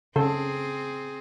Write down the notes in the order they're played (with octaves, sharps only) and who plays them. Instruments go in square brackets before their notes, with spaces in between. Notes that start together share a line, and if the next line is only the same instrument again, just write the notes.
[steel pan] C#3 A4 [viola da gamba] C4 G#4